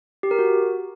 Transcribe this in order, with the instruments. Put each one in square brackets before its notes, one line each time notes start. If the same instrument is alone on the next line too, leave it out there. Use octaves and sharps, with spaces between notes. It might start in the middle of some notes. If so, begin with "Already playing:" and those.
[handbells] G4
A#4
F#4